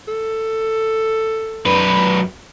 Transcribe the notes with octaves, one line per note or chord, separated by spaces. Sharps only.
A4
F#2 B4